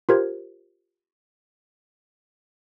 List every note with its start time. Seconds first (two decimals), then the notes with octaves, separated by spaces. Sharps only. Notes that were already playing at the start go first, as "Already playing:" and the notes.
0.09 F4 G4 A#4 C5 G#6